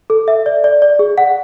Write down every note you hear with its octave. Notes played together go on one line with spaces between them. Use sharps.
A4
E5
D5
D5
D5
G#4
F#5